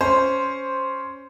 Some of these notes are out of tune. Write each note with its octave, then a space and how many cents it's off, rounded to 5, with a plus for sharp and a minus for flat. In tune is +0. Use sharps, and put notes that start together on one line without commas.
C#4 +5 C5 +0